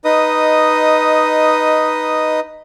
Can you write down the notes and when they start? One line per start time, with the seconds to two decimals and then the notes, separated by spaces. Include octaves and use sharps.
0.05 D#4 B4 D#5 D#6